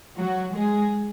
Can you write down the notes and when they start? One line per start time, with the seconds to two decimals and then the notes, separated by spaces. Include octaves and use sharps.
0.18 F#3 F#4
0.55 G#3 G#4